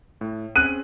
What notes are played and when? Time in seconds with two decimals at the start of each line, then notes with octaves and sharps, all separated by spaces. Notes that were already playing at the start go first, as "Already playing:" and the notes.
0.21 A2
0.56 C4 C#4 G#4 F#6 D#7